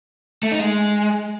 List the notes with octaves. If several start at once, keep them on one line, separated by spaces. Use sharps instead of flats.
A3
D#4
G#3